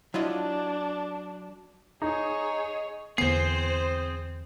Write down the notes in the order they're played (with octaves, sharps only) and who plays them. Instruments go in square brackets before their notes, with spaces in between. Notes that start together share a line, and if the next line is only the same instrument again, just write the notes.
[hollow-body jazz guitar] F#3 [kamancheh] D4 [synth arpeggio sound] E4 F4 D#5
[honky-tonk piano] D#4 [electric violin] G#4 C#5 [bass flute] D#5
[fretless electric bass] E2 D3 B3 [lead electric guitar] C4 G#4 [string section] C5 [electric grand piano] C7